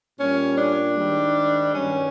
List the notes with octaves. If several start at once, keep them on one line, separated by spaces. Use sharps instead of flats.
A#2 G3 C#4
D4
G#2 D#3 G3
G2 D#3 F#3 C#4